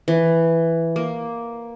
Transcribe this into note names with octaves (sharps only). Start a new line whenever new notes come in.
E3
A#3